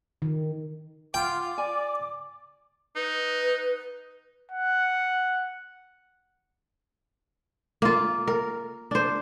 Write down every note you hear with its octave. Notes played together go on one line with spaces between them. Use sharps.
D#3
F4 F#5 G5 D6
D5 G#5
D#4 B4
F#5
A#3 F4
A#4
D4 C5